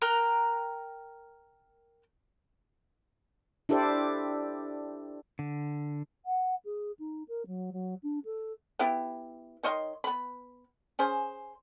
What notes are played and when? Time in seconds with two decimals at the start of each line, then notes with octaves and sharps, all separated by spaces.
0.02 A#4 G5 A#5 F#6
3.69 D4 E4 G4 A4 C5 D5
5.39 D3
6.25 F#5
6.65 G#4
6.99 D#4
7.28 A#4
7.46 F#3
7.72 F#3
8.03 D4
8.25 A4
8.79 B3 E4 G4
9.63 D#3 C#5 D#5 C6
10.04 B3 B5
10.99 C#4 G#4 C5